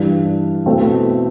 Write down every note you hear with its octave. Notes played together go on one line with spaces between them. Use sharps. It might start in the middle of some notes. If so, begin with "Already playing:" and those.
Already playing: G2 E3 G3 D4
B2 A3 C4 E4